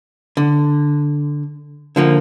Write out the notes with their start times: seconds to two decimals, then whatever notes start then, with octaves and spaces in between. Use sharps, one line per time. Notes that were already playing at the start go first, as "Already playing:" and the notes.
0.37 D3
1.96 D3 F3 A#3